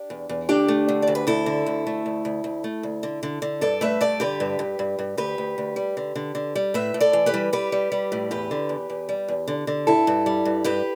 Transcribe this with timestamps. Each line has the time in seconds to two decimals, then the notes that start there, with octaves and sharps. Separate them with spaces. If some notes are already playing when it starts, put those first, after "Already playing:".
Already playing: D4 G4
0.10 E2
0.29 E2
0.49 D2 D4 G4
0.68 A3
0.89 D3
1.02 D5
1.08 D2
1.15 B4
1.27 D2 E4 A4
1.46 D3
1.66 D2
1.87 A3
2.06 D2
2.25 D2
2.44 D2
2.64 A3
2.83 D2
3.03 D3
3.23 D3
3.42 D3
3.61 G2 A4 D5
3.81 A3 B4 E5
4.01 G2 A4 D5
4.20 D3 G4 B4
4.40 G2
4.59 G2
4.79 G2
4.99 G2
5.17 D2 G4 B4
5.38 D2
5.58 D2
5.76 G3
5.97 D3
6.15 D3
6.35 D3
6.55 G3
6.74 A2 B4 E5
6.94 A2
7.00 A4 D5
7.13 E3
7.26 G4 B4
7.34 G3
7.53 G3 G4 B4
7.72 G3
7.92 G3
8.12 A2
8.31 E2 G4 B4
8.51 D3
8.69 E2
8.90 E2
9.09 G3
9.28 E2
9.48 D3
9.67 D3
9.87 G2 E4 A4
10.07 G2
10.26 G3
10.45 G2
10.64 G2 G4 B4